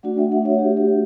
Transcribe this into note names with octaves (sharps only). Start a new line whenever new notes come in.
A3 D4 F#4 D5 F#5
E5 G5
D5 F#5
C#5 E5
G4
G4